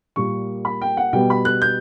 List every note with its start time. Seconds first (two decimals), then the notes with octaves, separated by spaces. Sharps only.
0.16 A#2 G3 A#3 C#6
0.65 B5
0.81 G5
0.97 F#5
1.13 B2 G3 B3 G5
1.30 B5
1.45 F#6
1.62 G6